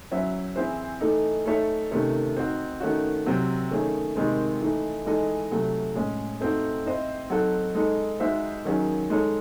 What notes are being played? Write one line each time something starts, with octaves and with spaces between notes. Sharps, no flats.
F#3 C#4 E4 C5 E5
E3 C4 E4 G#4 C5
E3 A3 D#4 A4
A3 D#4 A4 C#5 E5
C3 D#3 A3 C#4
C4 D#4 F#4
D#3 A3 C#4 F#4
C3 F#3 C4
D#3 A3 C#4 G#4 C#5
C3 D#3 G#3 C4
E3 A3 D#4
E3 G#3 D#4 A4 D#5
C3 F#3 A3
A2 G#3 C#4 G#4
A3 C4 D#4 F#4
C4 E4 C5 D#5
F#3 C4 D#4 F#4 A4
G#3 D#4 A4
G#3 D#4 F#4 C5 E5
D#3 F#3 C#4 G#4
G#3 D#4 A4 C#5